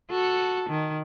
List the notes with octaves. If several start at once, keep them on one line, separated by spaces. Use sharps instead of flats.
F#4 A4
D#3